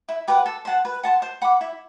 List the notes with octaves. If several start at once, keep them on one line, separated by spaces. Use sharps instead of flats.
E4
G4 B4 F#5
A4
C5 F#5 A5
B4
F#5 A5 C6
C5
F#5 B5 D6
E4